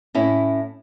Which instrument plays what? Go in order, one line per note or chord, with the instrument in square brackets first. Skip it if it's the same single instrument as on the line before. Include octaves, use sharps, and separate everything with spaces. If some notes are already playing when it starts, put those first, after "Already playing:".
[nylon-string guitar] A2 C#4 E4